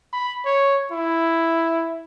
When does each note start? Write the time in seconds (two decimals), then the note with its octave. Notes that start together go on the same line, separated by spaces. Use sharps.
0.13 B5
0.45 C#5
0.92 E4